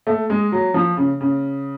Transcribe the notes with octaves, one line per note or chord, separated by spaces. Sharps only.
A3
G#3
F#3
F3
C#3
C#3